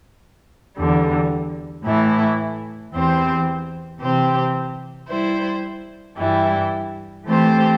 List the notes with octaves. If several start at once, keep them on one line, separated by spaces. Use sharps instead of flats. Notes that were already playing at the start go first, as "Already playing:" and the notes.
E2 D3 G3
A2 E3 A3 E4
E2 E3 C4 G4 C5
C3 E3 C4 G4 C5
G3 E4 C5
G2 E3 G3 E4
E3 A3 C4 G4 C5